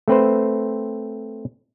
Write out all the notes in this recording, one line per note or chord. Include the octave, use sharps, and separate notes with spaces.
A3 C4 B4 C5